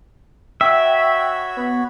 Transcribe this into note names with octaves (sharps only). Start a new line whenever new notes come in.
F#4 C#5 E5 G5 B5
B3